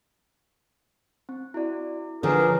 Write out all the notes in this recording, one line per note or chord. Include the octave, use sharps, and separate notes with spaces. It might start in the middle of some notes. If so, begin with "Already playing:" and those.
C4
E4 F#4 D5
D3 F3 G#4 A#4 B4 C#5